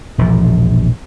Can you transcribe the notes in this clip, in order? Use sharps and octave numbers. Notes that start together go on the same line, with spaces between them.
E1 A#1 A#2 F3